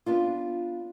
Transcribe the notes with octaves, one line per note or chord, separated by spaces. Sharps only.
B3 D4 F4